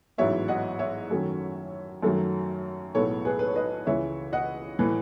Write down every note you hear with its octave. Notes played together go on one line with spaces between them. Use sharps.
A1 G#2 F#3 B3 C#5 E5
D#5 F#5
C#5 E5
F#2 D#3 F#3 A3 C#4
F#2 D#3 F#3 A3
B1 A2 G#3 B3 A4 C#5
G#4 B4
B4
C#5
B4 D#5
C#2 C#3 E3 C#5 E5
D#5 F#5
A2 E3